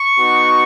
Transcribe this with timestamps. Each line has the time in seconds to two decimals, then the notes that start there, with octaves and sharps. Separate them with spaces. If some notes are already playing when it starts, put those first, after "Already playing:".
Already playing: C#6
0.19 B3 D#4 F#4